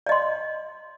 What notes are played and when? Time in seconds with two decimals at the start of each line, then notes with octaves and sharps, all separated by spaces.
0.06 D5
0.09 D#5
0.12 C6